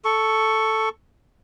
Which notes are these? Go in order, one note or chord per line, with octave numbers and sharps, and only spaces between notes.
A4 C#6